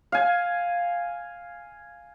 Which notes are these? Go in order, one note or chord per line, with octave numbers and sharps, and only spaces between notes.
F5 G#5